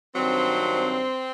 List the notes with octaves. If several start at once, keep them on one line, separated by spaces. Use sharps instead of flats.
G2 D#3 F#3 C4